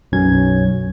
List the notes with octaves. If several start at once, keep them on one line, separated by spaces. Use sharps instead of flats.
B1 F#2 F#3 C#4 G#6